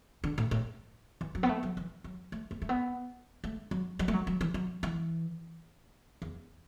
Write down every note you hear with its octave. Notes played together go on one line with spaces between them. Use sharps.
D3
A2
A2
E3
F#3
B3
A3
F#3
E3
F#3
A3
A3
A3
B3
A3
F#3
F#3
A3
F#3
F#3
E3
F#3
E3
E2